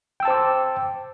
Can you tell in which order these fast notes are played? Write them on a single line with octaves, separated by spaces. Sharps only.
G5 E6 A5 C5 D6